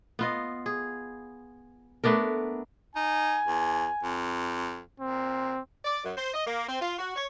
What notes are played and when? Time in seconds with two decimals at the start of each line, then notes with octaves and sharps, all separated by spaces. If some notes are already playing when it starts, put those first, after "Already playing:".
0.19 B3 F4 D#5
0.66 G#4
2.04 A3 B3 D4 A#4
2.96 D#4 G#5
3.47 E2
4.03 F2
5.00 A#2 C4
5.85 D5
6.04 F#2
6.17 C5
6.34 D#5
6.47 A#3
6.68 C4
6.81 F4
6.99 F#4
7.16 C#5